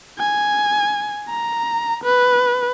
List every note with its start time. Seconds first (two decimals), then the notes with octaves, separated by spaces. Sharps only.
0.19 G#5
1.29 A#5
2.04 B4